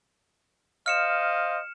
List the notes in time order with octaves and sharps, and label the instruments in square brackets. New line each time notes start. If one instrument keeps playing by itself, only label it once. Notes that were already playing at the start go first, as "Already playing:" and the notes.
[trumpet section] C5 D#5 F5 [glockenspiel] F6 C#7 E7